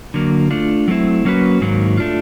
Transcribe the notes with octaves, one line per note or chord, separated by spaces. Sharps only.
D3 F#3 A#3
A3 D4 F4
F#3 A3 C4 E4
F#3 A#3 C#4 F#4 B4
G#2 D#3 F#3 A#3
A3 D4 F4